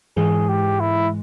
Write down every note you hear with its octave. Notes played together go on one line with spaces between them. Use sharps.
G#2 E3 G#3 G#4
G4
E4